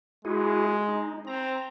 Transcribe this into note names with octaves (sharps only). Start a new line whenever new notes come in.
G#3 E4 F#4 G#4
D#4
C4 A#5